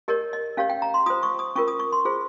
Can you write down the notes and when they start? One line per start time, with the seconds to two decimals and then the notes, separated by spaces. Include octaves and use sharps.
0.08 G4 A#4 C#5 D#5
0.33 D#5
0.57 C#4 G4 C#5 F5
0.70 G5
0.82 A#5
0.94 C6
1.06 F4 C5 D#6
1.23 C#6
1.39 D#6
1.56 C#4 F4 A#4 C#6
1.68 D#6
1.80 C#6
1.92 C6
2.05 F4 G#4 C5